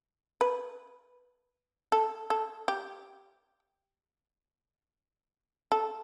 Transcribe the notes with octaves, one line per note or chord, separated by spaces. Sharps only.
B4
A4
A4
G4
A4